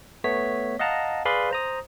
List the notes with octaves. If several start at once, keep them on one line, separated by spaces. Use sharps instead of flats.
A3 B3 C#5 B6
D#5 F5 F#5 A5 A#5
G#4 B4 D5 F5 B5 C6
C5 A#5 D#6